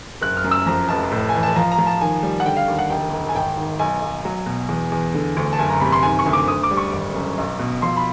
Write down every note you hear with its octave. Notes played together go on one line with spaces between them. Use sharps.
F#1 F#6
F6
F#2
E6
F2 A#5
F1 A5
A2
E3 G#5
A5
F3 A#5
A#5
F3
A5
D#3 G#5
G3
F#5
D3 G5
F5
D#2
F#5
E1 G5
E1
G#5
G#1 G5
D#3
B1 G#5
B1
F#3
B2
E2
E2
D3
D2
A5
F#1 G#5
A#5
C3 B5
C6
D#3 G#5
C#6
D2
D6
D2 D#6
D6
G3
C#6
G#1
F#2
B1
B2
F3 C6
B5